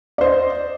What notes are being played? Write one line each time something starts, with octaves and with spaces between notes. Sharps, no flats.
C5 D5 D#5